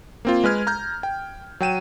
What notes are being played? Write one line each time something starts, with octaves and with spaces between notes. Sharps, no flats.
A#3 C4 F4
G#3 B4 F6 G#6
A#5 F6 G6
G5
F#3 G5 D#7 E7